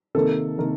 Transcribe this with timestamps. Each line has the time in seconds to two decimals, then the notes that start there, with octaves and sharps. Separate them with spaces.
0.15 C3 D#3 A#3 A4
0.58 C3 D#3 A#3 A#4